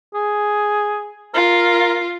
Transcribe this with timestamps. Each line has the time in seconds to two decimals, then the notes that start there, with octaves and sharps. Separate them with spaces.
0.14 G#4
1.34 F4 A#4